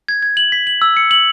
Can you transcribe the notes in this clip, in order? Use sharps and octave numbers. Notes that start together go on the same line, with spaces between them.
G#6
G#6
F#7
B6
F#7
E6
C#7
F#7